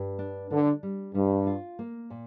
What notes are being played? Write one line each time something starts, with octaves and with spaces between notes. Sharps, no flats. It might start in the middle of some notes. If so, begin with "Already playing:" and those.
Already playing: G2 G4
D4
D3 D4
G3
G2 G3
F4
A#3
A#2